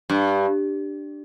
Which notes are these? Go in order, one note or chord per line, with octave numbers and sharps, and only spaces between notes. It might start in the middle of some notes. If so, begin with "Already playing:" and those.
G2